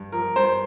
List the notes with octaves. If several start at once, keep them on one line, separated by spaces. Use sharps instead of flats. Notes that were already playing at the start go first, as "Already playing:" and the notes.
Already playing: G2
F3 A#4
G2 C5